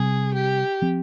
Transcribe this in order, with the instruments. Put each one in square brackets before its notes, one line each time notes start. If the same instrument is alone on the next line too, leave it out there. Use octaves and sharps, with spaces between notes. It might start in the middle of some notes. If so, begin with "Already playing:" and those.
Already playing: [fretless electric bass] C3 G3 C4 [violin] G#4
[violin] G4
[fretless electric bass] F3 C4